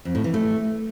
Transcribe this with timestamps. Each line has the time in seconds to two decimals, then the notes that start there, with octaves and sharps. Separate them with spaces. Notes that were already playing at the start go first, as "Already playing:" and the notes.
0.05 F2
0.15 A2
0.24 E3
0.34 A3